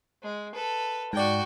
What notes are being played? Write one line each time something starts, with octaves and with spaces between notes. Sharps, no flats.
G#3
A4 B4
G#2 F#4 D5 G5